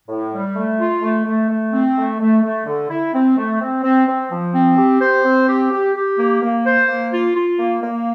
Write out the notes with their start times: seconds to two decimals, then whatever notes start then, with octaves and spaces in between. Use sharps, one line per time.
0.08 A2
0.32 G3
0.55 A3
0.79 F4
1.02 A3
1.25 A3
1.50 A3
1.73 C4
1.96 A3
2.20 A3
2.43 A3
2.66 D3
2.90 E4
3.14 C4
3.37 A3
3.61 C4
3.83 C4
4.07 C4
4.31 F3
4.54 C4
4.78 G4
5.01 C5
5.25 C4
5.48 G4
5.72 G4
5.95 G4
6.19 A#3
6.42 A#3
6.66 C5
6.88 A#3
7.12 F4
7.35 F4
7.59 A#3
7.83 A#3